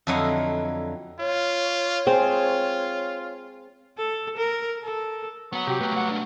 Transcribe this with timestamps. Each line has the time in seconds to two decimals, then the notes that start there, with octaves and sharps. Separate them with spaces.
0.07 F2 D3 F#3 E4 D#5 F5
1.20 F4 C#5
2.07 C4 F4 G#4 C5
3.97 A4
4.37 A#4
4.83 A4
5.53 F#3 B3 F#5
5.67 C3 F#4 G4 F#5 D6
5.81 A3 A#3 B4
5.96 F#5
6.10 D4